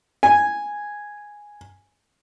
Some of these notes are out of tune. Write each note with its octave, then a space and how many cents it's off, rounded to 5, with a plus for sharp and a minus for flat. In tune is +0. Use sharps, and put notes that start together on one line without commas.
G#5 -5